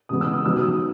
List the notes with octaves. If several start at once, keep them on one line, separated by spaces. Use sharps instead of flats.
C#3 E3 G#3 B3 D#6
E6
D#6
D#3 F#3 B3 E6
D#6